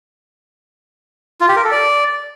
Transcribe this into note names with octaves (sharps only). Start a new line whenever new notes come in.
F4
G4
A#4
A4
D5